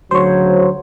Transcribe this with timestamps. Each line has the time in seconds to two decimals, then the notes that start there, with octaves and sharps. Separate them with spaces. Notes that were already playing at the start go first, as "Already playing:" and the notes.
0.11 D2 C#3 F#3 C5 C#5